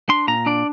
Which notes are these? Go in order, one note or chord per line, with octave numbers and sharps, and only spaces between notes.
D4 C6
A#2 A#5
D4 D5